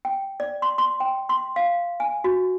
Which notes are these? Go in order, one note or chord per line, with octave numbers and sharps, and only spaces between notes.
G5
D5
C6
C6
G5
C6
F5
G#5
F#4